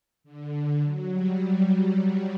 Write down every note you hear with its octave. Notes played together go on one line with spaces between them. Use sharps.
D3
F#3
G3